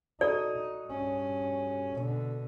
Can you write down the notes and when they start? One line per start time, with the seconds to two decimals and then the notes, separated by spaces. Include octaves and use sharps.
0.21 D#4 F#4 A4 D5 D#6
0.87 G2 C#4
1.98 B2 D3